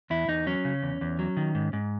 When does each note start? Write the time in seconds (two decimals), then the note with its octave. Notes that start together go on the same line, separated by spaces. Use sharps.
0.10 E2 E4
0.28 E2 D#4
0.46 F#3 C#4
0.65 C#3
0.83 E2
1.01 E2
1.19 F#3
1.37 D#3
1.55 G#2
1.73 G#2